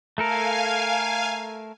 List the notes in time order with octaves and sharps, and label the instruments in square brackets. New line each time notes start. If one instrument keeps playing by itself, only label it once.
[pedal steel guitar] A3 A4 A#4 [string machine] F5 G#5